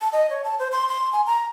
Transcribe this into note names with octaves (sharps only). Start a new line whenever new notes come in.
A5
D#5
C#5
A5
C5
C6
C6
G#5
A#5